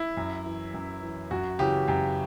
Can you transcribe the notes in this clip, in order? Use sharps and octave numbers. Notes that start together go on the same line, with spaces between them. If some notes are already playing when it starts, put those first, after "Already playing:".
Already playing: E4
F#2
E3
F#2
E3
F#2 F#4
C#3 E3 G4
F#2 G4